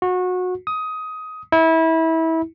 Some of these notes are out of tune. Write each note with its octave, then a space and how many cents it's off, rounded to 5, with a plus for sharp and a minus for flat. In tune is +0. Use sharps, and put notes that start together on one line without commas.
F#4 -25
D#6 +15
E4 -25